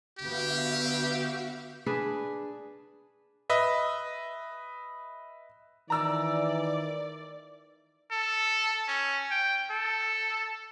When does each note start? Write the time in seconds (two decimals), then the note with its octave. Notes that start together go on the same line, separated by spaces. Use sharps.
0.19 D3 B3 F#4 G4 E5 F5
1.86 D4 G#4 B4
3.50 B4 D#5 E5
5.90 D#3 E3 D5 A#5 E6
8.12 A4
8.87 C#4
9.31 G5
9.71 A4